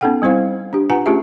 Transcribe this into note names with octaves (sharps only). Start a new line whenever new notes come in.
B3 C#4 D#4 A4 F#5 G5
G3 C4 E4 C5 F5
D4 G4
F4 B4 F#5 G#5 A#5
A3 C#4 F4 G4 G#4 E5